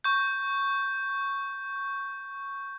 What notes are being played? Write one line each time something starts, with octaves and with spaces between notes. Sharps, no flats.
C#6 G6